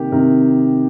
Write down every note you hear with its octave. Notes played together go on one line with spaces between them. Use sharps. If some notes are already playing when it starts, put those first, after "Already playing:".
Already playing: C3 D#3 A#3 G4
C3 D#3 A#3 A#4